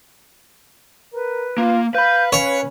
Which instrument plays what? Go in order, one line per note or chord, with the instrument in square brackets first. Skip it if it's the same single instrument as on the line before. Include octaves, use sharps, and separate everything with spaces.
[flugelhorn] A#4 [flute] B4
[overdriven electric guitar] A#3 [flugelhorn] F4
[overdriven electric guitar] B4 B5 [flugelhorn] F5 [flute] G6
[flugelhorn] C#4 [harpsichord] C#5 [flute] F5